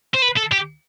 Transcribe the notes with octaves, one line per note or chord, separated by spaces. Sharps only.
C5
B4
A4
G4